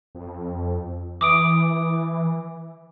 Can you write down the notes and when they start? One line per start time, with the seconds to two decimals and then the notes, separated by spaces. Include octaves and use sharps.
0.15 F2
1.21 E3 D6 D#6 D7